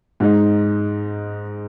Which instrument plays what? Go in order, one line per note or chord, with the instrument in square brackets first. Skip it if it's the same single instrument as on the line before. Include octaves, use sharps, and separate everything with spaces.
[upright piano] G#2 G#3 D#4